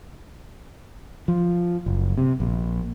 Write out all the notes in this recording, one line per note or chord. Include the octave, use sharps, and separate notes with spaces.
F3
F#1
C3
A#1